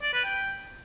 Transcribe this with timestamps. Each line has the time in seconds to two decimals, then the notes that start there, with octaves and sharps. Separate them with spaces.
0.03 D5
0.13 B4
0.24 G5